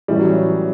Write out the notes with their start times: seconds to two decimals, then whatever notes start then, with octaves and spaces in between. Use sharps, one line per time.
0.08 A1 A2 E3 G3
0.19 F#3